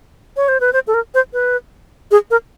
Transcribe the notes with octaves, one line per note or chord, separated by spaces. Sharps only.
C#5
C5
B4
C5
A4
A#4
C5
B4
G#4
A#4